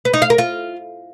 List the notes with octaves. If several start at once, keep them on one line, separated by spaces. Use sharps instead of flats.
B4
D#4
F5
A#4
F4